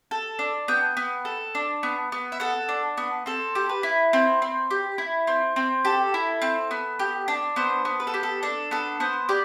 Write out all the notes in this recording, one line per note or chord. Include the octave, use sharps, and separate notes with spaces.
A4
D4
B3 G5
B3
A4
D4
B3
B3
E5
A4 F#5
D4
B3
C4 A4
G4
B4
E4
C4
C4
G4
E4
C4
C4
G4 A4
E4
C4
B3
G4
D4
B3 C5
B3
B4
A4
G4
A4
D4 A4
B3 A4
B3 C5
G4 D5